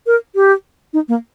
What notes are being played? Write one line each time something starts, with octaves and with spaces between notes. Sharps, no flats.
A#4
G4
D#4
A#3